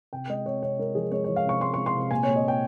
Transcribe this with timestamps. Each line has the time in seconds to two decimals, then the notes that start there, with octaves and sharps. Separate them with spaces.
0.13 C3 G5
0.29 G#3 D#5
0.46 C3 C#5
0.62 C3 C#5
0.79 G#3 A#4
0.95 F3 G#4
1.11 G#3 C#5
1.24 F3 C#5
1.36 F5
1.45 C3 C#6
1.61 G#3 C6
1.74 G#3 C#6
1.86 C6
1.95 C3
2.11 A#2 G#5
2.23 A#2 C#5
2.36 D#5
2.44 A#2 G5